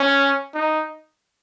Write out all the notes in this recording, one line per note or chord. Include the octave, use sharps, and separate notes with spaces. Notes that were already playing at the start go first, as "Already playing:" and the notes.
Already playing: C#4
D#4